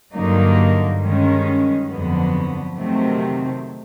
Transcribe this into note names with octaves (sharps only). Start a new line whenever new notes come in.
G2 D3 F#3 A#3 D#4
G2 D#3 G#3 C#4
F2 D3 F#3 B3
C3 D#3 F#3 A3 C4